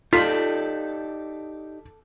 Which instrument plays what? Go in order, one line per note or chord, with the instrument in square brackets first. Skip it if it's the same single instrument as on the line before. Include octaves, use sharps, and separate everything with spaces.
[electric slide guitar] D#4 G4 D5 [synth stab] F4 [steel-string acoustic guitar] A4 [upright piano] B6